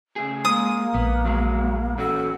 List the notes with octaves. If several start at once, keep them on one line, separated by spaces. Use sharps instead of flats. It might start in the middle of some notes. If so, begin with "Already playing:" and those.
C#3 A3 G#4
G#3 A#3 D#6
A#1 B3
F#3 G#3
E2 C#4 F#4 A4